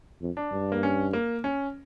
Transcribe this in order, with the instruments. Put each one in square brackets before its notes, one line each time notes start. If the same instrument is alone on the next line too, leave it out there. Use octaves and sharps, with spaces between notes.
[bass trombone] F2
[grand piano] D4
[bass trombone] G2
[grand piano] A#3
C#4
A#3
C#4